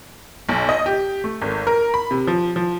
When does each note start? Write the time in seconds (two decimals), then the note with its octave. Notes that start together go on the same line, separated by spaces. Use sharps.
0.49 B1
0.69 D#5
0.86 G4
1.24 A3
1.42 G#1
1.67 A#4
1.94 B5
2.11 C3
2.27 F3
2.56 F3